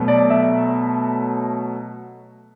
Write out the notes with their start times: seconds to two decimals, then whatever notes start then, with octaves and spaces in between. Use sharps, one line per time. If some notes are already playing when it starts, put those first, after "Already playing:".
Already playing: B2 F#3 A3
0.08 D5
0.30 E5